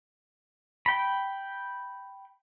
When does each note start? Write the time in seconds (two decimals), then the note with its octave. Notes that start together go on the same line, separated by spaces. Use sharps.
0.86 G5 B5